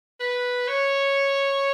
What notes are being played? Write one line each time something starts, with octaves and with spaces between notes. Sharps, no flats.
B4
C#5